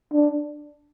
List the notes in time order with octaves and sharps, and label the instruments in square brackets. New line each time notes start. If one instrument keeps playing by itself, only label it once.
[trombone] D4